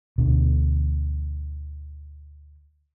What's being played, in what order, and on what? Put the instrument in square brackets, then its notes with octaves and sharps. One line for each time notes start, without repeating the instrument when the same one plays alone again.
[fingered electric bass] D2 B2 D3